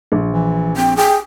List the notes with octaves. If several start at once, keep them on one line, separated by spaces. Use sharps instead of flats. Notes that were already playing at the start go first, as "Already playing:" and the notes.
A#1
E3
C4 G5
G#4 G5